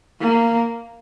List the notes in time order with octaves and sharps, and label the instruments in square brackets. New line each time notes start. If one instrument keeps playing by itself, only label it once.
[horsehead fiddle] A#3